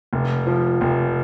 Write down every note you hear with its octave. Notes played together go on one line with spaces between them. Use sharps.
F1
F3
F1